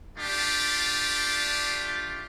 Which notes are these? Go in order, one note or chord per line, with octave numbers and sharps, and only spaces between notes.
A3 D4 F4 G4